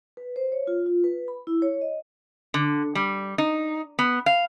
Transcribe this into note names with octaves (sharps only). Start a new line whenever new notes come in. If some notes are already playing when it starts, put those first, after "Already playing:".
B4
C5
C#5
F4
F4
B4
B5
E4
C#5
D#5
D3
G3
D#4
B3
F5